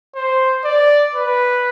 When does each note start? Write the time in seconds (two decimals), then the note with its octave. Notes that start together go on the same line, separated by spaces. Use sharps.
0.15 C5
0.65 D5
1.15 B4